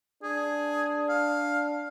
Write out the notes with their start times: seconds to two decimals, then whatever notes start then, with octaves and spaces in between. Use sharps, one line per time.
0.23 D4 G#4
1.09 F5